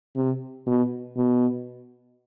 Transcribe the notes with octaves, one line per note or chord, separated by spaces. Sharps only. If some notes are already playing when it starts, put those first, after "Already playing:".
C3
B2
B2